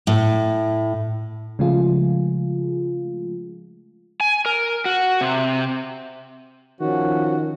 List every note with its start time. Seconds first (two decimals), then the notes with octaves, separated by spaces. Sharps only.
0.07 A2
1.59 C#3 F3 G#3 A3 F4 G#4
4.21 G#5
4.46 A#4
4.85 F#4
5.21 C3
6.81 D#3 F3 C#4 F#4